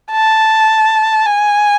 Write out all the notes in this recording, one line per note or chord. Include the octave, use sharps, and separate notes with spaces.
A5
G#5